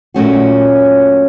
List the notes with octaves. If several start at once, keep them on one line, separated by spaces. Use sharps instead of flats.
A#2 F#3 A3 C#4 F#4